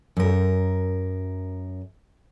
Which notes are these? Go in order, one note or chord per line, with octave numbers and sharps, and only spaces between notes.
F#2 A#4